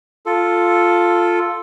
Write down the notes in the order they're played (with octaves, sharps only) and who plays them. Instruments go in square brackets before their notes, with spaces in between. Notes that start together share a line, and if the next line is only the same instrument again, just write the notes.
[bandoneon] F4 A4